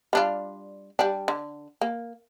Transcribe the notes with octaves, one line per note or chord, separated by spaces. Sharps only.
G3 D4 F4
G3 D4
D3
A#3